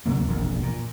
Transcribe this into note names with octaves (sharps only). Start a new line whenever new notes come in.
D2 C3 F#3 A#3
E1 A#1 F2
A#2